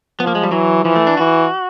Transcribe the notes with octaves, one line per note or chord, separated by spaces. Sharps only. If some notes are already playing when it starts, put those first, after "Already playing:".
F3 B3
A#3
G#3
G3
E3 F#3
E3 F3
A3
D4
E3 F#4